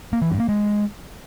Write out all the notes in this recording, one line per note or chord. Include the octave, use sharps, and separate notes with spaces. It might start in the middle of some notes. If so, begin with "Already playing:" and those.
A#3
E3
G2
A#3
G#3